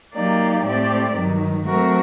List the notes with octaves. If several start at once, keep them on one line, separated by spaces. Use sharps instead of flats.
F#3 A#3 D#4 G4 D5
A2 A3 C4 G4 D5
G2 D#3 F#3
F#3 A3 C4 F#4 A#4